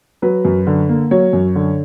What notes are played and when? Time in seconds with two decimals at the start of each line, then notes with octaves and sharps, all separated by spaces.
0.22 F#3 B4
0.45 F#2
0.67 D3
0.89 A#3
1.11 F#3 C#5
1.33 F#2
1.55 D3